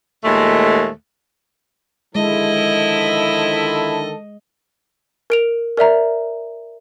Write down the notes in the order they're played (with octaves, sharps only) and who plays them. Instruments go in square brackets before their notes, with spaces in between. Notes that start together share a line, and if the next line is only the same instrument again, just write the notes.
[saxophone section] D#2 A#2 G#3 A3
[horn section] D3 D#3 A4 [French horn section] F3 E4 [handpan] G#3 [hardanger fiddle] D#5
[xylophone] A#4 D7 F7
A#4 D5 E5 A#5